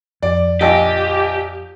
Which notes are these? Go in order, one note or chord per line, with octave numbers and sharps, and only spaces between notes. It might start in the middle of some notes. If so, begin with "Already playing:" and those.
F2 D5
A#1 G4 D#5